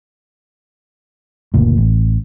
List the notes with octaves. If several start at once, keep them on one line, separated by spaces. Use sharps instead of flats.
F#1 D2 A#2
A1